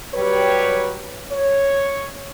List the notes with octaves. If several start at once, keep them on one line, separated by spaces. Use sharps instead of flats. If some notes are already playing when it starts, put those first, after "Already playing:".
F#3 G3 G4 B4 C#5
C#5